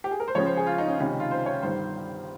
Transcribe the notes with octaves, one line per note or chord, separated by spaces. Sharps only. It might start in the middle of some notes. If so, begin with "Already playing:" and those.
G4
G#4
A#4
C5
C#2 C#3 F3 C#5
C5
G#4
F4
D#4
C#4
C#2 C3 D#3 C#4
D#4
F4
C5
C#5
G1 G2 D#3 C5